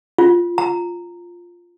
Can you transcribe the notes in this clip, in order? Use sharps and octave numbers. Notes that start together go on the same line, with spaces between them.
F4
A#5